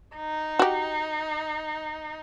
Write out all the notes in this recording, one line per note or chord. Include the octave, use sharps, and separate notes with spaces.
D#4
F#4 G4